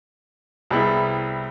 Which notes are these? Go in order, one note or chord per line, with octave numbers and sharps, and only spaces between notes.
C2 G3 B3 E4 G#4